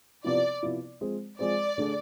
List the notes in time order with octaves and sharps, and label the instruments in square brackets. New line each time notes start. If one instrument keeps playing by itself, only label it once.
[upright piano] C3 F3 B3 E4 [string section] D5
[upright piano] C3 F3 B3 E4
F3 G#3 C4 G#4 C5
[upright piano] F3 G#3 C4 G#4 C5 [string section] D5
[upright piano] D3 A3 D4 G#4